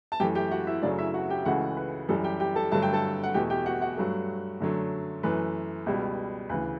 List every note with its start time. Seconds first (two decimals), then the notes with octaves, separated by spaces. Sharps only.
0.12 A5
0.20 F#2 E3 A3 G4 G5
0.35 G4 G5
0.51 F#4 F#5
0.67 E4 E5
0.82 F#2 C#3 F#3 A3 D4 D5
0.99 E4 E5
1.14 F#4 F#5
1.30 G4 G5
1.45 C#2 C#3 E3 A3 F#4 F#5
1.77 B4
2.09 F#2 E3 G3 A4
2.24 G4 G5
2.40 G4 G5
2.56 A4 A5
2.72 G2 D3 F#3 A3 A5
2.83 G5
2.93 A4 A5
3.23 F#5
3.34 E2 B2 A3 G4 G5
3.50 G4 G5
3.66 F#4 F#5
3.82 F#4 F#5
3.97 G2 F#3 A3
4.60 F#2 D3 F#3 A3
5.23 F#2 E3 A3 B4
5.86 C#2 B2 G3
6.49 D2 C#3 E3 B4